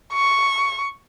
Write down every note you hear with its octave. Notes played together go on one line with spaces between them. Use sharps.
C#6